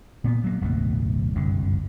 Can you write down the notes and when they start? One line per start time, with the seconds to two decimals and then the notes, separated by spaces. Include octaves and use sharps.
0.24 A#2 A#3 B3
0.44 F#3 A#3
0.61 D1 B1 F#2 A3
1.36 F#1 C2 G2 D3